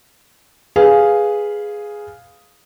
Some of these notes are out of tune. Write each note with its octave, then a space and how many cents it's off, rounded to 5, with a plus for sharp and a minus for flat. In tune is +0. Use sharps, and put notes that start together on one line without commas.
G#4 +0 B4 +0 F5 +0